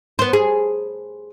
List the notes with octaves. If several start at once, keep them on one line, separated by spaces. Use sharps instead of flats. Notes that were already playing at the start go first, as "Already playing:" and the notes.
B3 C5
G#4